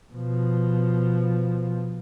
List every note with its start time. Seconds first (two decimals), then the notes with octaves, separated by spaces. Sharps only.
0.13 B2 F3